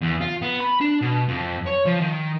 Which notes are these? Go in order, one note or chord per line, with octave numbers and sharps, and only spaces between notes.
E2
F4
B3
B5
D4
B2
F2
C#5
F3
D#3